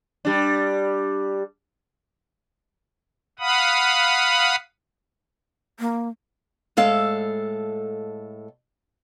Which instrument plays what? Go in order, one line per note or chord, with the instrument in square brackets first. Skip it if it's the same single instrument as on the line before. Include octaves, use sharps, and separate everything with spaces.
[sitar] G3 D4
[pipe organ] F5 F#5 B5 D#6
[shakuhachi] A#3
[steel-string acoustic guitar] A2 G#3 A4 F5